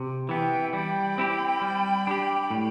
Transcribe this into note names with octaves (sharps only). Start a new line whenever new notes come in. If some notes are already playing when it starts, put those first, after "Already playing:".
Already playing: C3
E3 B3 E5 G5
G3 G5 B5
C4 E4 G4
G3
D4 G4
A2